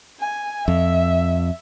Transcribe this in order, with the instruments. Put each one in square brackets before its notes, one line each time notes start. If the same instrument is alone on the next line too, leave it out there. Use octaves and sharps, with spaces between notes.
[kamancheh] G#5
[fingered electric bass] F2 [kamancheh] E5